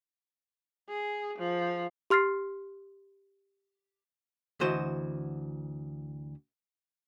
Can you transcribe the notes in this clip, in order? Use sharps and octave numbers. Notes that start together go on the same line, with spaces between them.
G#4
F3
G4 C6 F6 A6 C7
D2 E3 F#4 C5 D#5